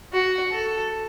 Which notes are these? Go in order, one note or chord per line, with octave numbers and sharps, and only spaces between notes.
F#4
A4